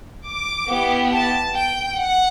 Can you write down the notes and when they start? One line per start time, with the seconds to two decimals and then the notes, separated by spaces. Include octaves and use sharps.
0.29 D6
0.70 B3 E4 G4
1.13 A5
1.55 G5
1.97 F#5